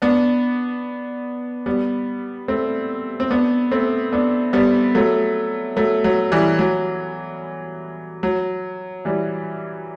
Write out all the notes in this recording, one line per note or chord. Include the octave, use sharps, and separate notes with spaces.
B3 D4
G3 B3
A3 C4
C4
B3 D4
A3 C4
B3 D4
G3 B3
F#3 A3
F#3 A3
F#3
E3 G3
F#3
F#3
E3 G3